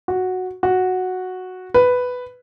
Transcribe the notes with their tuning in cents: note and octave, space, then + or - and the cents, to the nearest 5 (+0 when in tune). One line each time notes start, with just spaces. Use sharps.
F#4 -5
F#4 -5
B4 +5